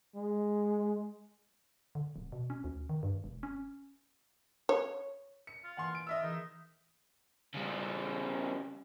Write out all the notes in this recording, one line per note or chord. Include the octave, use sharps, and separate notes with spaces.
G#3
D3
D1
B2
C#4
D2
D#3
G2
E1
C#4
C#5
C#7
F4
E3 A#3 F#5 G#5 C6
D7
F4 D#5 E5 E6
E3 D#4 G#4 A#4
C#3 G3